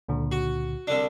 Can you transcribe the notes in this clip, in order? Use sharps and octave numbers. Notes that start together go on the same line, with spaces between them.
C#2 A#2 D3
F#4
C2 D3 D4